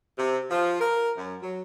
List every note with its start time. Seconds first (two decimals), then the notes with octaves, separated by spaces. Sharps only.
0.18 C3
0.50 F3
0.80 A#4
1.17 F#2
1.42 F#3